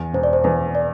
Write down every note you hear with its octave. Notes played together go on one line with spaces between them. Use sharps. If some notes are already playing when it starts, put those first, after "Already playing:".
Already playing: E2
E1 C5
D5
C5
E2 B4
D5